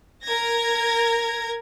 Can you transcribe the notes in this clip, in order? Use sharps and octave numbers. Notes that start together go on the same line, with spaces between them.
A#4 G#6 A#6